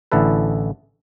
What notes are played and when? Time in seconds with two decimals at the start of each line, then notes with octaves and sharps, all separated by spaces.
0.12 A1 D3 E4 A4 B4